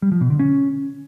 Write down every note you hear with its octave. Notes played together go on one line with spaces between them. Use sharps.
G3
F3
B2
D3
C#4